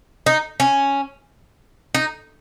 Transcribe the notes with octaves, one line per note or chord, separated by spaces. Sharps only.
D#4
C#4
D#4